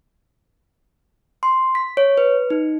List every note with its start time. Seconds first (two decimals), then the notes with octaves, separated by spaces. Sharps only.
1.43 C6
1.75 B6
1.97 C#5
2.18 B4
2.50 D#4